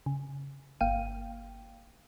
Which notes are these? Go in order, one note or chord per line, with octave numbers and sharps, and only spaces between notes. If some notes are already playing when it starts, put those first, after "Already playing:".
C#3
G1 A#3 F5 G5 D#7